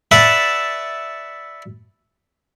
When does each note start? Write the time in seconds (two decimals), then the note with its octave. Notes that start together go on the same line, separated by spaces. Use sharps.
0.11 B4 D5 E5 F#5 A5